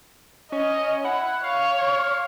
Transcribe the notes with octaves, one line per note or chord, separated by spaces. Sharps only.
C#4 D#5
E4 F#5
C#5 F5